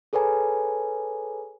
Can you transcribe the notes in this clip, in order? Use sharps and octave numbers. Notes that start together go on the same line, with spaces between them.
G#4 A4 B4 C#5 G#5 A#5